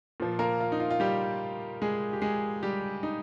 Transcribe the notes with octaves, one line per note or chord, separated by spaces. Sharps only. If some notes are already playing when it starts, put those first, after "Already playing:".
A#2 F3
A#3 A#4
F4
D#4
F4
F4
G3 G4
G#3 G#4
G4
G#3 G#4
G3 G4
D#4